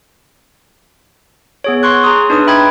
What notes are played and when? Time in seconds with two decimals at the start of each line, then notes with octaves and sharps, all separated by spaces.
1.64 B3 G#4 C#5
1.83 C6 C#6 F#6
2.04 G#4 A#5 C6 D#6
2.30 D4 D#4 B4 D#6
2.47 E5 G5 B5 D#6 G#6